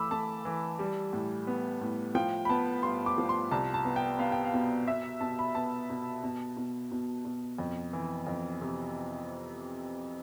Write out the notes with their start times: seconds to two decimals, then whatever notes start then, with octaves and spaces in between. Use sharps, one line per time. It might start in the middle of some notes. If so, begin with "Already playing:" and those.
Already playing: E3 A3 B5 D6 E6
0.11 A3 A5
0.45 E3
0.79 G3
1.13 A2
1.47 B3
1.81 A2
2.15 F3 G5
2.45 B5
2.49 B3 A5
2.83 G2 C6
3.06 D6
3.18 F3
3.29 C6
3.51 C2 A5
3.74 A5
3.85 B3
3.96 G5
4.19 B3 F5
4.32 G5
4.44 F5
4.54 B2
4.87 B2 E5
5.21 B2 A5
5.39 B5
5.55 B3 A5
5.90 B2
6.24 B2
6.57 B2
6.92 B2
7.25 B2
7.58 F2
7.93 E3
8.27 F2
8.61 C3